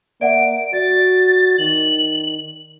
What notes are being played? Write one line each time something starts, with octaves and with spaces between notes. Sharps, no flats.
A#3 D5 E5 F#5 D7
F#4 D5 A6
D#3 F#7